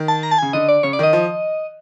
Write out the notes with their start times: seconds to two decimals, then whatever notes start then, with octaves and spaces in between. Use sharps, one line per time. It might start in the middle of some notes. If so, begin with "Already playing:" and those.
Already playing: D#3
0.08 A5
0.23 A#5
0.31 A5
0.38 C#3 G#5
0.53 D3 D#5
0.69 D5
0.83 C#3 C#5
0.93 D5
0.99 D#3 D#5
1.13 F3